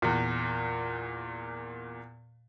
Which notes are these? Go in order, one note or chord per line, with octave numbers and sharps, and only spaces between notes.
E2 A#2